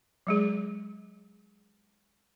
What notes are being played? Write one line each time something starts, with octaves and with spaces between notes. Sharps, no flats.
F#3 G#3 G#4